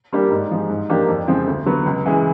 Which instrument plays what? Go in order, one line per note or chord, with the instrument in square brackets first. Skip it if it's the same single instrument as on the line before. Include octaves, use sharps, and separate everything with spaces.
[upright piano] G3 A#3 D4 G4
G#2
F3 G#3
G#2
F3 A#3 D4 G4
F2
C#3 F3 G#3 C4
D2
D3 F#3 B3
C#2
C#3 E3 G#3